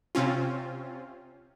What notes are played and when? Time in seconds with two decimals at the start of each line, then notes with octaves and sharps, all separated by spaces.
0.15 C3 C4 C#4 F4